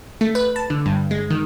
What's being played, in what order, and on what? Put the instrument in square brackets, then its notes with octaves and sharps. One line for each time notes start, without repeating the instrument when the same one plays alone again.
[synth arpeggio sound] A3
B4
A5
D3
G2
G#3
D#3